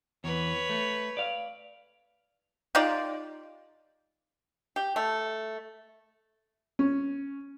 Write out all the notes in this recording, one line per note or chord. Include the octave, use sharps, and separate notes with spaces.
E2 B4 C#5
A3
D5 F5
D#4 F4 G4 D5
G4
A3
C#4